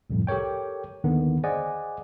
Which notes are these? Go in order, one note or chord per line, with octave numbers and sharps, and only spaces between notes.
C2 F2 A2
G4 A4 A#4 C#5 G5
D#2 D3 D#3 B3
G#4 C5 D5 D#5 F#5 G#5